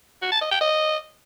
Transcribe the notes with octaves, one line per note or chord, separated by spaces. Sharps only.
F#4
A5
D#5
G5
D#5